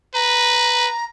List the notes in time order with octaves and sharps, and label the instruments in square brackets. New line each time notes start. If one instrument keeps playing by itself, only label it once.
[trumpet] B4 [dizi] A#5